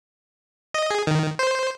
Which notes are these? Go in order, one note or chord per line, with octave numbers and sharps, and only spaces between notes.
D#5
G#4
D#3
C5